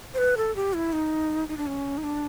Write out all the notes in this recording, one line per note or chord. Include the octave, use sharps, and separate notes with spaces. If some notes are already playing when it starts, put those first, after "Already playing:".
C5
B4
A4
G4
E4
D#4
D#4
D4
C#4
D#4
D4